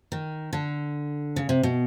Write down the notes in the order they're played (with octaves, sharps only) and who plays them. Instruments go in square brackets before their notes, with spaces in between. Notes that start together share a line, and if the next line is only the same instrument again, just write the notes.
[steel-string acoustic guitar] D#3
D3
C#3
C3
B2